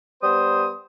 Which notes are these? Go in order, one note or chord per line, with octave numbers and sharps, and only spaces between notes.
G3 B3 C5 D#6